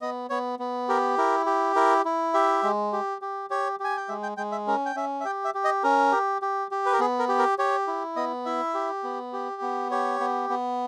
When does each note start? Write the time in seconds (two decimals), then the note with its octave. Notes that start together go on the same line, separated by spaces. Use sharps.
0.02 B3 D#5
0.30 B3 C#5
0.59 B3
0.89 G4 A#4
1.18 E4 A#4
1.46 G4
1.76 E4 A#4
2.05 E4
2.34 G4 E5
2.63 G#3
2.93 G4
3.22 G4
3.50 G4 C#5
3.80 G4 G#5
3.97 G5
4.09 G#3 E5
4.23 G5
4.37 G#3 G5
4.52 E5
4.67 C#4 A#4
4.86 G5
4.96 C#4 E5
5.21 E5
5.25 G4 G5
5.45 E5
5.55 G4
5.64 D#5
5.84 C#4 A#4
6.12 G4
6.42 G4
6.71 G4
6.86 B4
6.93 A#4
6.99 B3 G#4
7.19 A#4
7.29 G4
7.39 A#4
7.58 G4 C#5
7.87 E4
8.16 B3 D#5
8.46 E4 E5
8.74 G4
9.04 B3
9.33 G4
9.62 B3
9.91 G4 C#5
10.20 B3
10.50 B3